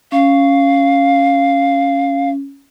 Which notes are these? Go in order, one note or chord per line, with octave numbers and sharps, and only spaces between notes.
C#4 F5